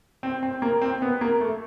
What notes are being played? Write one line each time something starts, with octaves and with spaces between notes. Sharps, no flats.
C4
C4
A#3
C4
B3
A#3
A3